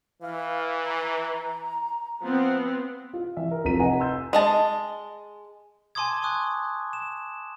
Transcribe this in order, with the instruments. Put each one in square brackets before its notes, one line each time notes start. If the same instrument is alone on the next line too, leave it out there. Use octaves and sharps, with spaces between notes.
[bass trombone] E3 [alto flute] F5
[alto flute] A#5
[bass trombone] F3 [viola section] B3 C4
[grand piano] F4
E3 E5
A#4
F1 F3 A#4 A#5 B6 D#7
B4 D#5 F#5 G#5 A#5
C6 E6 G6
[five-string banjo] G#3 D#5 A5
[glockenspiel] G#5 A5 C6 D6 D#6 G#6
C6 C#6 D#6 F#6
E7